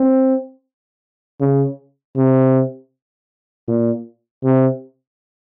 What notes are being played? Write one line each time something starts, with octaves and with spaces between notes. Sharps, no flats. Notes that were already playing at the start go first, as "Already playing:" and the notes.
Already playing: C4
C#3
C3
A#2
C3